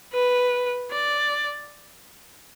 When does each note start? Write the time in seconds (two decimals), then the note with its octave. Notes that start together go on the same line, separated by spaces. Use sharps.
0.14 B4
0.91 D5